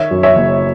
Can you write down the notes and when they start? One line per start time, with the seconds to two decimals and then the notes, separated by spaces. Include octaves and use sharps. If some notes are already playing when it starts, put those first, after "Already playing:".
Already playing: D#3 C#5 E5
0.11 F#2
0.23 C#5 E5
0.36 F#1